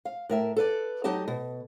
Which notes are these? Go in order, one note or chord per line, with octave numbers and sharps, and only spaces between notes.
F5
A2 A#4 E5
A4 B4 D5
F#3 D#4 G4 D#5 A5
B2